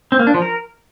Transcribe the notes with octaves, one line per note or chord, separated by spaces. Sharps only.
C4
A#3
D4
F3
A#4